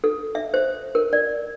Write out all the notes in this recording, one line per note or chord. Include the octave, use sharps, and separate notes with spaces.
A4
E5
C5
A#4
D5